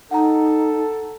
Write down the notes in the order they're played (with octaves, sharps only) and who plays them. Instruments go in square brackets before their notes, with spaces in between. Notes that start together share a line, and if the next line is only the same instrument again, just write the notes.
[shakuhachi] D#4 [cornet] A4 [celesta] F#5 A#5